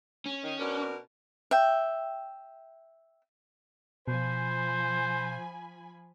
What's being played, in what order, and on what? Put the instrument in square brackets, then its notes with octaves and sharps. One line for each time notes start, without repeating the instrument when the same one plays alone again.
[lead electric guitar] C#4
[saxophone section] D#3
B2 D4 A#4
[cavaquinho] E5 G5
[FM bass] B2 [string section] F3 G#5 B5 [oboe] C5